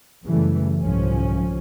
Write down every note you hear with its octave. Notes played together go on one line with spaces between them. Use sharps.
F#2 C#3 E3 G3 A3
C2 G#2 D3 F3 C#4